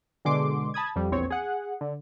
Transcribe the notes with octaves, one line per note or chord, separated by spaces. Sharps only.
B2 D3 G#3 C6 D6
A5 B5 D#6 G#6
F2 G3
A#1 E2 C4 C#5
G#4 F#5
D3